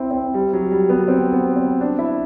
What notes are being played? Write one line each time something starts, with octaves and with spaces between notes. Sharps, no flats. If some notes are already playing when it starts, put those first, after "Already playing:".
Already playing: C4 E4
C4
G3
F#3
G3
B3
C4
B3
C4
D4
E4